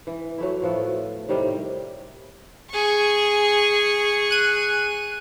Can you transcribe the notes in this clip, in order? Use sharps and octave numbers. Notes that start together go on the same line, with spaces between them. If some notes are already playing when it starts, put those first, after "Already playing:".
E3
F#3 A3 E4
A2 F3 B3 A4
A2 C3 D#3 G3
G#4 C#6
F#6 D#7